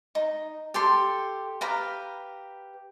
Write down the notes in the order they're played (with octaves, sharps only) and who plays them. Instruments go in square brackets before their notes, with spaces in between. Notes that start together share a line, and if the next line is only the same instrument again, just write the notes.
[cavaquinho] D#4
G4 A4 C6
G4 B4 F5 A#5